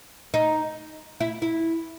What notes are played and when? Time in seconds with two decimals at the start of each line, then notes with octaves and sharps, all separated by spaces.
0.34 D#4
1.20 E4
1.42 E4